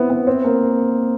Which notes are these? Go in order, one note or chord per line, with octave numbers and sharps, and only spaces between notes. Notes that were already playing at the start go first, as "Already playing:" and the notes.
Already playing: B3 C4 E4
B3
C4
A#3